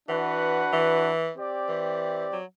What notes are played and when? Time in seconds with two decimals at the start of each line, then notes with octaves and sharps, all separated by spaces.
0.09 E3 D4 F#4 B4 F#5
0.73 E3
1.37 C4 G4 D5
1.69 E3
2.32 F#3